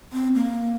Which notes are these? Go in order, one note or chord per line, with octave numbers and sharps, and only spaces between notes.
C4
A#3